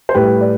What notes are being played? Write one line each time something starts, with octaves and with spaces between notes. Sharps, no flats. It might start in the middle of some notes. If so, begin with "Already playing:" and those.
C5
A2 G3 G4 B4
D5